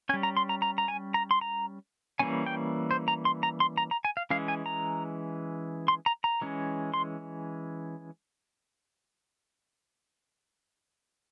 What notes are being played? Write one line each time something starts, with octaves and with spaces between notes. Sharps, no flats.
G3 C#4 G#5
A#5
C6
A#5
A#5
A#5
G#5
A#5
C6
A#5
E3 G3 A#3 C#4 G#5
G5
C5
A#5
C6
A#5
C6
A#5
A#5
G#5
F5
E3 G#3 C#4 F5
G#5
A#5
C6
A#5
A#5
E3 G#3 C#4
C6